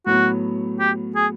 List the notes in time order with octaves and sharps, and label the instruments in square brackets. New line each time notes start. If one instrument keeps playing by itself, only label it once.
[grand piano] A2 F#3 B3 [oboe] F#4
[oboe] G4
G#4